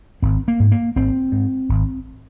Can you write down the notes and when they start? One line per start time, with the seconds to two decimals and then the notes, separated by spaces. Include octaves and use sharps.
0.22 G#1 C4
0.48 A#3
0.60 G#2
0.72 A#3
0.96 G#1 C4
1.32 G#2
1.69 G#1